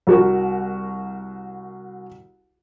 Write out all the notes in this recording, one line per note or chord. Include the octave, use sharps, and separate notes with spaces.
C2 F#4 A#4